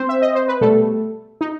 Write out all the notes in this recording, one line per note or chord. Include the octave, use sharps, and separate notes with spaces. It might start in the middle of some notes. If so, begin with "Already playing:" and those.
Already playing: C4 C5
E5
D#5
C5
B4
B2 G3 A3 A4
D#4